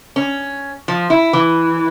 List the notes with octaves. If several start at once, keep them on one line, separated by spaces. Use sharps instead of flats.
C#4
F3
E4
E3